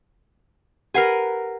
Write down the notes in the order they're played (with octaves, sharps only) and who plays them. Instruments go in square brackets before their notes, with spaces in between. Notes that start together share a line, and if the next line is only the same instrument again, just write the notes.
[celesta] G4 F#5 C7 [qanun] A#4 B4 G#5